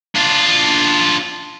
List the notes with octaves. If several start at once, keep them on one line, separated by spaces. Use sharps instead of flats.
D4 F4